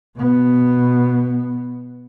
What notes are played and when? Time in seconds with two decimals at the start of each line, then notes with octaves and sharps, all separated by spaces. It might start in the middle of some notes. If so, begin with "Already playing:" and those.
0.15 B2 B3